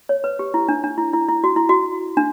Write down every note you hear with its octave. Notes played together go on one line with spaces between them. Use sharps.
C#5
B4
G4
E4
D4
D4
E4
E4
E4
F#4
E4
F#4
D4